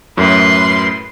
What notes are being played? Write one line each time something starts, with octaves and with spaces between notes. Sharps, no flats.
F#2 A2 B4 C6